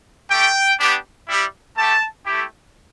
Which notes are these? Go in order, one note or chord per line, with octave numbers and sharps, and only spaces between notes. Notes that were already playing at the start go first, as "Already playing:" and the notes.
A3 G4 G5
B3 D4 G4
G3 E4 G4
A3 G4 A5
A3 E4 G4